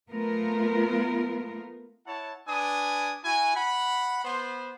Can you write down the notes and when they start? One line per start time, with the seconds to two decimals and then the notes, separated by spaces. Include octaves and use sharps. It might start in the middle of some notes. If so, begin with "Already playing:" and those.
0.11 A3 B3 F4 A#4
2.06 E4 C#5 F#5 A5
2.47 D4 B4 G#5 D#6
3.24 E4 F#4 G#5
3.55 F#5 B5
4.25 B3 B4 C5